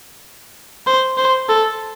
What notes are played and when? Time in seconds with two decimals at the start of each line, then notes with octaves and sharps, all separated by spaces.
0.87 C5
1.18 C5
1.49 A4